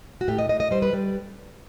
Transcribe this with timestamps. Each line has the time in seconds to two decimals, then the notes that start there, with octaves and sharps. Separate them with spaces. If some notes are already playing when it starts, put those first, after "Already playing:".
0.21 F#4
0.28 A2 G4
0.38 D#5
0.49 A2 D#5
0.60 D#5
0.71 G3 C5
0.82 B4
0.93 G3